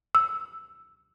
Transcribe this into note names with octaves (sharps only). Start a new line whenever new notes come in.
E6